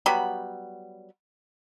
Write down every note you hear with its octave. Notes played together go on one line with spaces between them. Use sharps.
F#3 G3 B3 B5